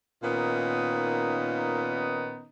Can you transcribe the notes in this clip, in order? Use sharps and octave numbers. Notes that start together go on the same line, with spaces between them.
A#2 D#3 B3 C#4 D#4